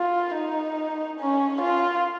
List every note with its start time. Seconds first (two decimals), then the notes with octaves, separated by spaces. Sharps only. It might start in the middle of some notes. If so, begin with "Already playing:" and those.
Already playing: F4
0.35 D#4
1.20 C#4
1.61 F4